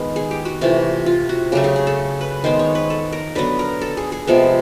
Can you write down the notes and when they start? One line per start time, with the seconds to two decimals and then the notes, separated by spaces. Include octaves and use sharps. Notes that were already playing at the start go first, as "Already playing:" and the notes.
Already playing: D#3 G#3 B3
0.16 G#4
0.31 G4
0.45 F#4
0.61 C3 E3 A3 F4
1.06 F4
1.29 F#4
1.52 C#3 F#3 A3 G4
1.64 G#4
1.76 G#4
1.87 A4
2.21 B4
2.44 D#3 G#3 B3 C5
2.59 C#5
2.75 B4
2.90 A4
3.13 A#4
3.35 D3 F#3 B3 B4
3.59 A#4
3.81 A4
3.97 G#4
4.12 G#4
4.27 C3 F3 G#3 B3 A4